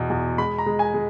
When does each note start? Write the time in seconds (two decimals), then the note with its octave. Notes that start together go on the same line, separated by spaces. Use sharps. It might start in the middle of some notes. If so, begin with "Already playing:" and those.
Already playing: E2 B2
0.10 E2
0.38 G#3 B5
0.58 A#5
0.66 G#3
0.79 G#5
0.94 G#3